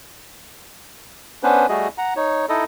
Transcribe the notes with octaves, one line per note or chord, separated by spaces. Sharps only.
B3 C#4 D4 B4 C5
G3 A3 F#4 G#4 D#5
F#5 A#5
D#4 C#5
D#4 E4 A4 D#5